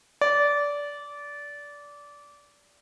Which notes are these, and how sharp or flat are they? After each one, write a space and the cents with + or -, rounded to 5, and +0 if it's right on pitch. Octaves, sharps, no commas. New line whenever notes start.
D5 -20